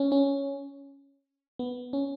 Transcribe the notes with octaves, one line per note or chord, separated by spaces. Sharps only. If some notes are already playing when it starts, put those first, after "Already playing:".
Already playing: C#4
C#4
B3
C#4